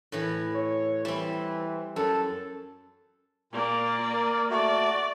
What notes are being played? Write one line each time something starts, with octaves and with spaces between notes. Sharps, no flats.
A2 E3
C#5
E3 G3 C4
F#2 A4
A#2 A#3 D5
A#4
A3 F#4 D5